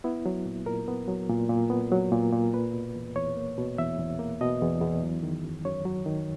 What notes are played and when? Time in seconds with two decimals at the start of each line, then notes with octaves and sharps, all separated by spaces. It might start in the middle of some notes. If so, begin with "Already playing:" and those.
0.04 B3 E4
0.26 F#3
0.45 A#2
0.66 A#2 A#4
0.88 B3
1.08 F#3
1.30 A#2
1.49 A#2
1.70 B3
1.92 F#3
2.11 A#2
2.32 A#2
2.53 A#3 B4
2.74 B2
2.96 E2
3.16 E2 C#5
3.37 A#3
3.58 B2
3.78 E2 E5
3.99 E2
4.19 A#3
4.41 B2 D#5
4.62 E2
4.81 E2
5.03 F#3
5.23 D#3
5.44 F#2
5.65 F#2 C#5
5.85 F#3
6.06 D#3